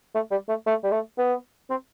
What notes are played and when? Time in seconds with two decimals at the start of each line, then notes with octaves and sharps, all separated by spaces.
0.15 A3
0.31 G3
0.49 A3
0.66 A3
0.83 G3
0.92 A3
1.18 B3
1.70 C4